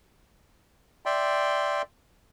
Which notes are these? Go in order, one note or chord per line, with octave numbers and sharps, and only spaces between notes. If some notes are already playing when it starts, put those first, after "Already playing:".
D5 E5 G5 C6